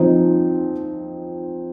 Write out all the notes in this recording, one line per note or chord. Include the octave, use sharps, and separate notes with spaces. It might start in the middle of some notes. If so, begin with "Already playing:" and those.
Already playing: F3 C4 D#4